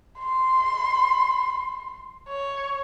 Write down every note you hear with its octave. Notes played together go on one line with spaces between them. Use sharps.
C6
C#5